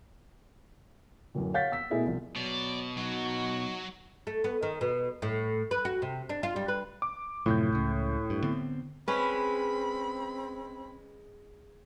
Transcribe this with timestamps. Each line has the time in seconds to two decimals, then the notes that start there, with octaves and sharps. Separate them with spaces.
1.35 D1 F#2
1.54 C#5 F5 F#5 G6 A6 B6
1.72 E6 B6
1.90 B2 A3 E4 G#4 A#4
2.06 C2 F3
2.36 B2 F#3 D5
2.98 F#3 D#4 F#4
4.27 A3
4.44 B3
4.63 D#3
4.81 B2
5.22 A2
5.71 B4
5.85 F#4
6.02 C3
6.29 D4
6.43 F4
6.56 G3
6.68 B4
7.02 D6
7.46 F#2 A2 C3 F3 G6
7.72 C#2 C#3
8.30 G2
8.43 D3 B3 C4
9.08 G#3 C4 C#4 B4 B5